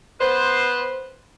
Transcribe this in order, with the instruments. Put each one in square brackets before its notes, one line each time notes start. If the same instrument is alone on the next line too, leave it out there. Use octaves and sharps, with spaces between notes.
[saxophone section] B3 B4 C5